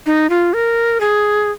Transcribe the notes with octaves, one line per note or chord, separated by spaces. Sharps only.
D#4
F4
A#4
G#4